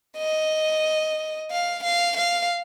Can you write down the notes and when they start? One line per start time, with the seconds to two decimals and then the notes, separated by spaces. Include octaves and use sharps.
0.18 D#5
1.51 F5
1.84 F5
2.17 F5